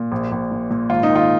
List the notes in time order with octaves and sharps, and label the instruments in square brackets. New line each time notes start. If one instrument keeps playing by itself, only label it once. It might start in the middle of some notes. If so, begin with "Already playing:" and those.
Already playing: [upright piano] A#2
A#1
A#1
A#2
A#2
G#1 F4
D#4
D#3
F4